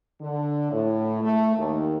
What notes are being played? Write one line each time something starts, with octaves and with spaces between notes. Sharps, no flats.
D3
A2
A3
D#2